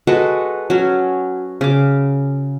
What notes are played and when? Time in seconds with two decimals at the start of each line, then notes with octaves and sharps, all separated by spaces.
0.07 G#3 F#4 A4 B4
0.70 F#3 C#4
1.61 C#3 D6